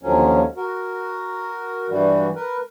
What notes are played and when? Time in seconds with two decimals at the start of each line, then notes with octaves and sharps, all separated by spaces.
0.03 D#2 D3 F3 F#3 C#4
0.57 F#4 A#4
1.90 G2 E3 G3 F#4
2.36 A#4 B4